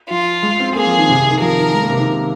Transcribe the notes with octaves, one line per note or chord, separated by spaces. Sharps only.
F3 F4
G#3
C4
A#3 G#4
F3
D#3
C3
C3
D#3
F3 A#4
D#3
G#3
A#3
C3
D#3